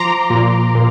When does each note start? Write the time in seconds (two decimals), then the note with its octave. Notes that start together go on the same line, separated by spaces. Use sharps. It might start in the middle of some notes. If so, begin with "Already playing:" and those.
Already playing: F3 A#5 C6 D6
0.30 A#2
0.75 A#2